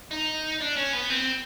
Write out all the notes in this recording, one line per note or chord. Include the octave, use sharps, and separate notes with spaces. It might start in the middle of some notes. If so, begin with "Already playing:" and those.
D#4
D4
C#4
B3
C4